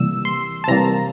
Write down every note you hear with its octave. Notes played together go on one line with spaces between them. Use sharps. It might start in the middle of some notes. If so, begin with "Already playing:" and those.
Already playing: C3 E3 G3 A#3 E6
C6
A5
C3 E3 G3 A#3 A#5